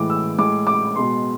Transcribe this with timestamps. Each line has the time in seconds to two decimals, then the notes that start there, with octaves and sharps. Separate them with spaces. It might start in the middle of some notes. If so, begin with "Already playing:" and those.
Already playing: A2 E3 G#3 D6
0.10 E6
0.38 A2 G#3 D6
0.67 D6
0.96 B2 G#3 C6